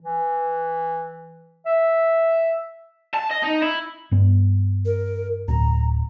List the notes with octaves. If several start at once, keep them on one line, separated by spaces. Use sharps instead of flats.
E3
E5
A5
D#5
D#4
E4
G2 B3
A#4
D1 A#5